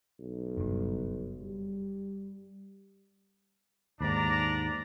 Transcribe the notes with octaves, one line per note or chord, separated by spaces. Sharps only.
B1
F#1 G2
G3
D#2 G#2 D4 D5 A#5